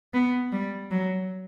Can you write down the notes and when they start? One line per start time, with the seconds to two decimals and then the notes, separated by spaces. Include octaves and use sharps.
0.14 B3
0.52 G3
0.91 F#3